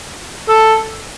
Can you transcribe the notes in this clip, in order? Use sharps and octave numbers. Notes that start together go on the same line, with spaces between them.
A4